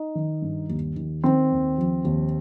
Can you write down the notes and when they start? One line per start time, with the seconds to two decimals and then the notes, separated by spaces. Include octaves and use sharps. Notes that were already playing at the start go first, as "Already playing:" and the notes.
Already playing: D#4
0.15 D#3
0.42 G2
0.69 D#2
0.96 D#3
1.24 D#3 C4
1.52 D#2
1.78 F3
2.05 D#2